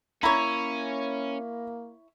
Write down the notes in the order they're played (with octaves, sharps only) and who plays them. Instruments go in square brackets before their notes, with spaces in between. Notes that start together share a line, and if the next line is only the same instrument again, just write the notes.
[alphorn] A#3 [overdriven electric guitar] C#4 [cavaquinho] E4 C#5 [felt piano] A#5 B5